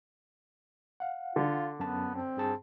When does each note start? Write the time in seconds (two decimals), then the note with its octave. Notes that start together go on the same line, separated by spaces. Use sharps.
1.00 F5 F#5
1.36 D3 F4
1.80 F#2 B3 A5
2.15 C4
2.37 G2 G#4 A5